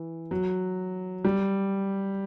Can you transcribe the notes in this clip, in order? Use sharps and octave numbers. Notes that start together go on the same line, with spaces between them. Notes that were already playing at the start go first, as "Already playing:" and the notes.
Already playing: E3
F#3
G3